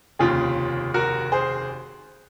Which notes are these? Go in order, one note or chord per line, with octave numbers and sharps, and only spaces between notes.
F1 D#2 C#3 F4 G#4
F#4 A#4
G#4 C5